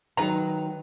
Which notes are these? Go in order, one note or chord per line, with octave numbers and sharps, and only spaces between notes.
D#3 E3 F#3 B4 A#5